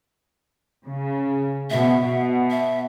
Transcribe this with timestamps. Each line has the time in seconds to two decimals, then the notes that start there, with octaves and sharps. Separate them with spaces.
0.86 C#3
1.71 B2 E5
2.01 B2
2.51 E5